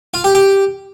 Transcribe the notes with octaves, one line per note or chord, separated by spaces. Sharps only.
F4
G4
G4